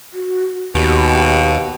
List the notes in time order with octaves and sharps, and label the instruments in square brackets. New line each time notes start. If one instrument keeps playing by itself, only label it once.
[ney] F#4
[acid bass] D#2 [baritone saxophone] B2 [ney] G4